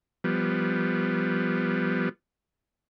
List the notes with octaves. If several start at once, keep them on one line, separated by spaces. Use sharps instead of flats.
F3 G3 B3